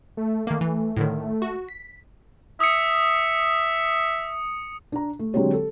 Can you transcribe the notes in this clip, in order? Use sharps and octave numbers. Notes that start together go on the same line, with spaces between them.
A3
D#3 A3 A#3
E3
A2 D3 D#3
F#4
B6
E5 D#6 C#7
D4 A#5
A3
D3 F#3 G#3 C4 G4 C#5
A4